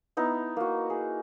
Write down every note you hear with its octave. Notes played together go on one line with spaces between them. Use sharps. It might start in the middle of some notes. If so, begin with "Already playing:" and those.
B3 D#4 E4
A#3 F#4
G#4